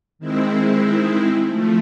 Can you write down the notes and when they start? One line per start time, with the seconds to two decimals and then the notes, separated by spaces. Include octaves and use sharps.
0.19 D#3 G#3 C4 E4
1.47 F3 A3